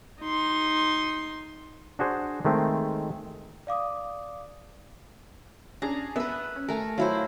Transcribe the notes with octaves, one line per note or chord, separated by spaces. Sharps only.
D#4 C6
D4 F#4 G#4 C5
D#3 G#3 A3 C4
D5 F5 D6 D#6
C#4 D4 G#4 A#5
B3 B4 E5
C#4
A3 A#4 G#5
F#3 E4 F4 C5